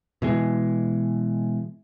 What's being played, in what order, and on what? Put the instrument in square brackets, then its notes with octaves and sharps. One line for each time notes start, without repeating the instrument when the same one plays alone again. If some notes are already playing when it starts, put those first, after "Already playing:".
[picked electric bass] B2 E3 G#3